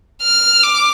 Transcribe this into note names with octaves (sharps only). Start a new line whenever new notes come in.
F6
D6